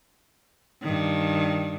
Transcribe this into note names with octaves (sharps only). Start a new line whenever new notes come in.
G2 D#3